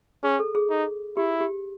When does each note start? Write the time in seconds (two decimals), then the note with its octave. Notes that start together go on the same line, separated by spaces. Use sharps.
0.23 C#4 G#4
0.39 A4
0.55 G#4
0.70 D#4
1.17 E4 G4
1.40 G4